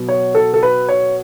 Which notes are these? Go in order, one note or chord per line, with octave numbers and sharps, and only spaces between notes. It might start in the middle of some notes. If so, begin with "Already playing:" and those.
Already playing: B2 F#3 B3
C#5
A4
A4
B4
C#5